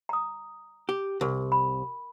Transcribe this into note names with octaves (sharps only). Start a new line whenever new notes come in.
A#5 D#6
G4
C2 A#4
B5